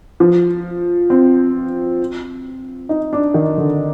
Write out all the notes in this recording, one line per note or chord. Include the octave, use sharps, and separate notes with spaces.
F3
C4
D#4
D4
D#3
D3